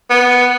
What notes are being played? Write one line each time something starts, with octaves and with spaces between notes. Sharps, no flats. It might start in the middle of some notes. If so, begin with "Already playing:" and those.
B3